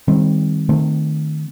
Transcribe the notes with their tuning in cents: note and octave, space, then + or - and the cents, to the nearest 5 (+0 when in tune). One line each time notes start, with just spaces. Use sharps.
D#3 +0 G3 +30 C4 +0
D#3 -20 A3 +0 C4 -15